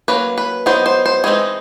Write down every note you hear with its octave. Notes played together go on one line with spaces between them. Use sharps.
F#3 A#3 C#4 B4
B4
F#3 B3 D#4 C5
C5
C5
E3 G#3 C4 D#4 G#4